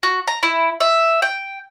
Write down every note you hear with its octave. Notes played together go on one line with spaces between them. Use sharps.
F#4
A#5
E4
E5
G5